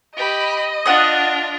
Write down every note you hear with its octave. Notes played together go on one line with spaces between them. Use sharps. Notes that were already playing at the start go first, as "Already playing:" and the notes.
G4 D#5 B5
D4 F4 F#5 D#6